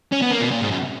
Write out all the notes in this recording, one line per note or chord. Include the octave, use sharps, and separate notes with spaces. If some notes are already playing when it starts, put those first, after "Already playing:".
C#4
B3
A#3
B2
A#2
G#2
F#2